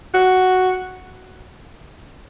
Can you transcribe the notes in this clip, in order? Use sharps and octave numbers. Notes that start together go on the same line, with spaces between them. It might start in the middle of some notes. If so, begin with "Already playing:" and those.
F#4